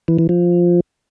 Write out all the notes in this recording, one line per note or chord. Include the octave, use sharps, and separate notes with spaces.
E3
E3
F3